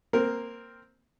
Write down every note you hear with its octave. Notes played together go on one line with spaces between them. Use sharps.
A#3 C4 A#4